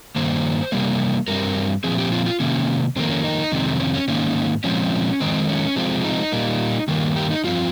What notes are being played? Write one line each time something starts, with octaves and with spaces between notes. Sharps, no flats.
G2 D#3 A#3 C5
C3 G3 A#3
G2 G3 C4 A#4
A#2 F3 C4 G#4
G4
F4
F4
C3 D#3 A#3 C#4
F2 D#3 A#3 C4
C#4
D#4
F2 C3 D#3 G#3 C4
C#4
C#4
G#2 D#3 A#3 C#4
A#2 F3 G#3 C4 C#4
F2 D#3 G#3 C4
C#4
C3 F3 G#3 C4
D#4
A#2 G3 A#3
G2 D#3 A#3
G4
D#4
G2 F3 C4 F4